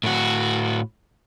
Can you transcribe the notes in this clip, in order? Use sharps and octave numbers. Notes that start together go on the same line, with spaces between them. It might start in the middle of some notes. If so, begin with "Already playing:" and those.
A2 F#4